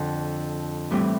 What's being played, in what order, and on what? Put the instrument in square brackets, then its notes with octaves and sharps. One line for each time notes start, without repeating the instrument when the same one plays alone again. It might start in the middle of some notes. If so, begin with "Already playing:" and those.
Already playing: [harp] F2 D3 F3
A2 E3 G3 C4